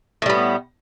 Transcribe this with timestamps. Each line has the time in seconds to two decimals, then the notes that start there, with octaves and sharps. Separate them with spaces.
0.22 A2
0.26 G3
0.30 B3